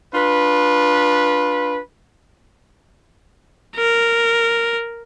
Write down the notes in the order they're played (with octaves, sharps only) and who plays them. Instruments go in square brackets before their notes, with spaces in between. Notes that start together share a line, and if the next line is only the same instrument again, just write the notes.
[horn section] D4 F4 B4
[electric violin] A#4